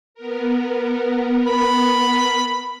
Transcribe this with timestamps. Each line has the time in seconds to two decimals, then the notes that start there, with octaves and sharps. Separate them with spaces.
0.15 B3 A#4
1.47 B5